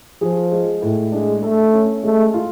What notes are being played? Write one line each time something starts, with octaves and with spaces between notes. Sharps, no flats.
F3 G#4
G#3
A2
G#3 D4
A3 A4
C#4
G#3 A3
F4